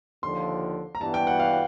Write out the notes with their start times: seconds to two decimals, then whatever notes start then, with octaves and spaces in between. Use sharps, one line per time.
0.23 D#2 D3 F3 C6
0.95 A#5
1.01 G2 E3 G3 B3 A5
1.14 G5
1.27 F#5
1.40 F5